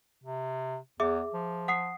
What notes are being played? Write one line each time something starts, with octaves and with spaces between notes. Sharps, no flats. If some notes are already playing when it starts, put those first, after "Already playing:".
C3
E2 G#4 E5 D6
F3
F#5 D#6 C7